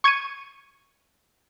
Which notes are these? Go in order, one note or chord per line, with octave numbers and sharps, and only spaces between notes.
C#6 G#6 C#7 D#7